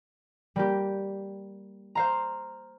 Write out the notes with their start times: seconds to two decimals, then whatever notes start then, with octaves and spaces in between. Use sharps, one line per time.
0.56 G3 A#3 G4
1.95 C5 F5 A#5